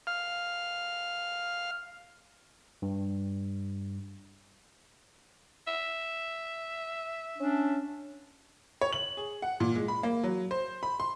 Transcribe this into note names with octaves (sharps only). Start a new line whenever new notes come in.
F5 F6
G2
E5
C#4 D4
C#5
F#7
G#4
F#5
A#2
G#3
B5
A#3
F#3
C5
B5
C6